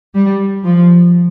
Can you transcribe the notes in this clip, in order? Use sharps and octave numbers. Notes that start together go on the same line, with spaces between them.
G3
F3